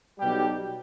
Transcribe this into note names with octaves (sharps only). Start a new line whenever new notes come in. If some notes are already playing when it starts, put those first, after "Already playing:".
B1 B2 G3 G4